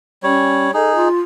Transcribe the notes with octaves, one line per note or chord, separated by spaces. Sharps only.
G3 C#4 C#5
D#4 G#4 A4
F4